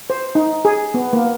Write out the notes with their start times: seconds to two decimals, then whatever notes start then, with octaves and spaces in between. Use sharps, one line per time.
0.10 C5
0.35 D#4
0.65 G#4
0.94 B3
1.13 A#3